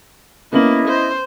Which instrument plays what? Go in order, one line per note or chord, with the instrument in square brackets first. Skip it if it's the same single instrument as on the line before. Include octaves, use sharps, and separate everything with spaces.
[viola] A#3 [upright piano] B3 C#4 F#7 [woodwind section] E4 D#5
[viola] C5